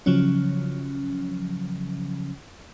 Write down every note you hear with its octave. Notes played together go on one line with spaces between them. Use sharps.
C#3 F3 F#3 C#4